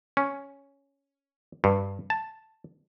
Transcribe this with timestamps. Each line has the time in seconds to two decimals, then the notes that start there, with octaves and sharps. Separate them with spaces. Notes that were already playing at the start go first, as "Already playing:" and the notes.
0.17 C#4
1.64 G2
2.10 A5